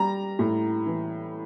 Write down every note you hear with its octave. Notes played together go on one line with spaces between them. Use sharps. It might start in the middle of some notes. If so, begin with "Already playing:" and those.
Already playing: G3 A#5
A2
E3